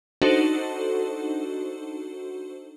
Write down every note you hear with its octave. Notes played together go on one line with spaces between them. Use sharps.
D4 D#4 F#4 A4 C5